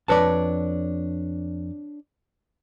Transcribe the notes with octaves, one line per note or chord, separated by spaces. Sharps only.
F2 D4 B4 C#5 D5 A5